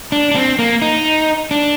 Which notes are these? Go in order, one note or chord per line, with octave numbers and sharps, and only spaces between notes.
D4
D4
C4
A#3
D#4
D4